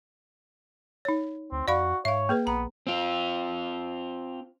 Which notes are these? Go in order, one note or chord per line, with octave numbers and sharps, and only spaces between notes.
D#4 C#5
D2 C4
F2 F#4 D5 F5 B5
G#2 C#5 E5 F5
A#3 G#4 B4
A#1 B3 A#5
C4 F4